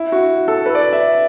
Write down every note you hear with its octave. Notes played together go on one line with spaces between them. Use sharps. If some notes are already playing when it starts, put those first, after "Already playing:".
Already playing: E4
F#4
A4
B4
D5
E5